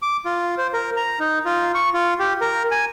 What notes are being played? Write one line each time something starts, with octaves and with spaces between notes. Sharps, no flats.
D6
F4
C5
A#4
A#5
D#4
F4
C#6
F4
G4
A#4
G#5